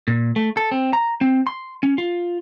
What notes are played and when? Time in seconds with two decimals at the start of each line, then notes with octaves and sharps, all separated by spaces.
0.08 A#2
0.36 A3
0.57 A4
0.71 C4
0.93 A#5
1.21 C4
1.47 C6
1.83 C#4
1.98 F4